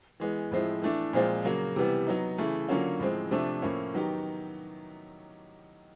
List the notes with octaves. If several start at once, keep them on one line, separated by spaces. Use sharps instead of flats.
E3 G#3 B3
A2 F3 G#3 C4 E4
E3 A3 D4
A#2 F3 G#3 C4 F4
C#3 F#3 A#3
C3 E3 G3 B3
F#3 B3 D#4
C#3 E3 A3
D3 F#3 A#3 C#4 F4
A2 F3 G#3 C4
C3 F3 A3 D4
A2 F3 A#3 C#4 E4
D#3 F#3 B3 D#4 G4